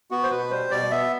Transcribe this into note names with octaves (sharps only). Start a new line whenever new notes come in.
B3 F#4
C5
B2 B4
G3 C5
B2 D5
B3 E5